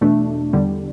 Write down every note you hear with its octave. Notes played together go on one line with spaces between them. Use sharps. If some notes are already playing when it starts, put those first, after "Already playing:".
E2 B2 A3 D4
E2 D3 G3